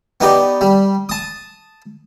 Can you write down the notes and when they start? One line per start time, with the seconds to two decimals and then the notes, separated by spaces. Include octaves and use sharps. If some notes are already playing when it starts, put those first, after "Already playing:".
0.21 B3 D#4 G4 D5
0.61 G3
1.09 A5 D#6